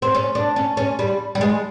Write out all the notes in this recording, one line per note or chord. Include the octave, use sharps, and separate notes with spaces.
C4
C#4
D4
C#4
C#4
G3
G3
G#3